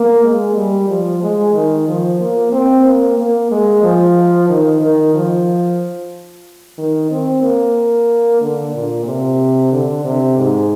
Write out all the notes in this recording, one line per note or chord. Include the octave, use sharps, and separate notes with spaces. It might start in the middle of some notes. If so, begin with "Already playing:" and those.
Already playing: A#3
G#3
G3
F3
G#3
D#3
F3
A#3
C4
A#3
A#3
G#3
F3
D#3
D#3
F3
D#3
C4
A#3
D3
A#2
C3
D3
C3
G#2